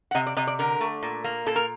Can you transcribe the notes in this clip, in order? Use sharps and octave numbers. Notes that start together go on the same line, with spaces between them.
F#5
C3 D#5
D5
C3 D#5
D5
D3 A#4
A3
A#2
A#3
A#2 A4
A#4